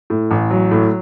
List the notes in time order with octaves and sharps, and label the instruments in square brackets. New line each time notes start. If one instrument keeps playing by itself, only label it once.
[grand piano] A2
A1
F#3
A2